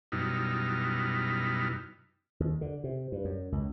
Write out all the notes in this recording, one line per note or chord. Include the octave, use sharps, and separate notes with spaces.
F#2 B2 G3 D#4 E4 F6
D#2
D3
C3
G2
F#2
C#2